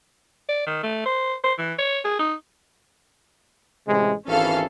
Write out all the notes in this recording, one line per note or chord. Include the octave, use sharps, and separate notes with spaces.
D5
D#3
A3
C5
C5
E3
C#5
G#4
D#4
A1 C3 G#3
G#1 E3 C#4 A4 F5